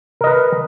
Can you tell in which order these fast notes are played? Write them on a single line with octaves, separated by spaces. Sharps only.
A#4 D#5 B4